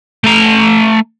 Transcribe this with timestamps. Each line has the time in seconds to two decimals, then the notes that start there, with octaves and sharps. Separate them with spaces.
0.24 A3 A#5